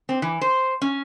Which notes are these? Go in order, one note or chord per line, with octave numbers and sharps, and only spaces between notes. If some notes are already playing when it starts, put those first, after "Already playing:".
C4
E3
C5
C#4